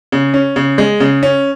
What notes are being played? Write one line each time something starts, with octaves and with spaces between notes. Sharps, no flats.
C#3
C#4
C#3
G#3
C#3
C#4